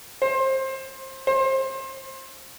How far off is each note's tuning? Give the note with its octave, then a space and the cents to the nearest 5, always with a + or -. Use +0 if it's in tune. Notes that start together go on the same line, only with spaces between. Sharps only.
C5 +25
C5 +30